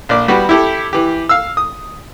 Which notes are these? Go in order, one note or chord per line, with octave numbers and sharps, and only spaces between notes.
A#1 D5
G3 B3 F#4 G4
E4 G4 A4
E3 G4
F5 E6
D#6